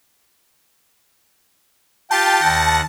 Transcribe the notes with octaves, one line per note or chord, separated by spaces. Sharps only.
F4 G4 G5 A5
D#2 F#5 A#6